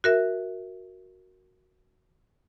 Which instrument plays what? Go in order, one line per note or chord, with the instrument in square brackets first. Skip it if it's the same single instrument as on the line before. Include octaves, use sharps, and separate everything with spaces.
[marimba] F#4 A#4 E5